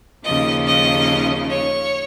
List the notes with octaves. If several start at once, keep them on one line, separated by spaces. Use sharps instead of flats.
D#2 C#3 F3 D#5
D#5
C#5